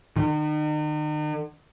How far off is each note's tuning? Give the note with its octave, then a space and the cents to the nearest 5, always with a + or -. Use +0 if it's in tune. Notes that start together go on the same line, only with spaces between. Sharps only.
D#3 -40